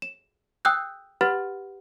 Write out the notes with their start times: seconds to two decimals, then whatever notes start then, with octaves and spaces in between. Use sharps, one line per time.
0.02 E7
0.65 G5 D#6 E6 F#6 G6
1.21 G4 B4 F#5 B5 F6 A6